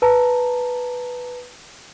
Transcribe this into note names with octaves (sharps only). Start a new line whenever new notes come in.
B4 A5 A#5